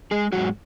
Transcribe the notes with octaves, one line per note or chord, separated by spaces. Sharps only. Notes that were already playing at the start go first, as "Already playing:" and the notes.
G#3 G#4
G#2 D#3 F#3 G#3 F#4